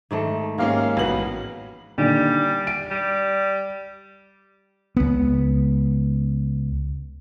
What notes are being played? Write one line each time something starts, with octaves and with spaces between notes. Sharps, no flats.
G#2 D#3 A3
G#2 G#3 A#3 C#4 G4 F5
A1 B3 F#4 F#7
A#2 D3 D#3 G3
D7
G3
C#2 B3